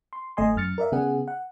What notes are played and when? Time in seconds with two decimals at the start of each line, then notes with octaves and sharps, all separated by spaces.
0.13 C6
0.37 G1 A3 D#5 G#5 C6
0.56 F#2 F6 A6 C#7
0.78 A#4 D5 E5 F5
0.92 C#3 B3 G#4 F#5
1.28 F#5